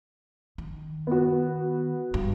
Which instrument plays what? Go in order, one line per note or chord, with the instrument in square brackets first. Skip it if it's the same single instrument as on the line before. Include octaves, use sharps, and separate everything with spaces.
[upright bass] D#3
[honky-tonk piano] B3 F#4
[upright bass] G2